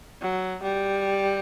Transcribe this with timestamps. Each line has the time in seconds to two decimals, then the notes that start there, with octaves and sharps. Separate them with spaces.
0.21 F#3
0.62 G3